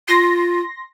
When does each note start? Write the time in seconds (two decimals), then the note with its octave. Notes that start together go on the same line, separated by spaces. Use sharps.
0.08 F4 C6 A#6